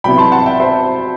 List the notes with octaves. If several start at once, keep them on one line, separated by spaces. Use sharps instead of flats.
C2 C3 F#3 B3 E4 G5 B5
A5 C6
F#5 A5
E5 G5
C5 E5